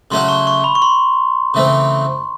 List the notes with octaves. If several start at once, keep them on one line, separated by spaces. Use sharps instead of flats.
C#3 F#3 A3 C#4 F#4 C6
C#6
C#6
B5
C#6
C6
C#3 E3 A3 C4